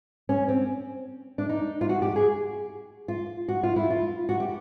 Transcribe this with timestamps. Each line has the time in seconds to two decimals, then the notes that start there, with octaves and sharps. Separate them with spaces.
0.29 C#4
0.48 C4
1.38 D4
1.49 D#4
1.81 F4
1.89 F#4
2.02 G4
2.16 G#4
3.08 F4
3.48 F#4
3.63 F4
3.76 E4
3.90 F4
4.29 F#4
4.40 G4